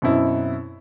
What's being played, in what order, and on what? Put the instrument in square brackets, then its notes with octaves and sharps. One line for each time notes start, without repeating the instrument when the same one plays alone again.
[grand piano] F#2 B2 C4 E4